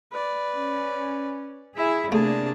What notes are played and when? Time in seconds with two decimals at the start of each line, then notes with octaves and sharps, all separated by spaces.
0.12 B4 D5
0.53 C#4
1.77 E4 G#4 E5
2.12 C3 A3 A#3 D4 G#4 A5